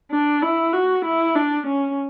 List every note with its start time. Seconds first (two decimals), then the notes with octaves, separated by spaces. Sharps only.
0.11 D4
0.42 E4
0.73 F#4
1.05 E4
1.35 D4
1.67 C#4